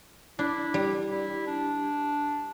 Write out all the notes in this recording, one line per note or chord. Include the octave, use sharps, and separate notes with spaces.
D4 E4
G3
E4
D4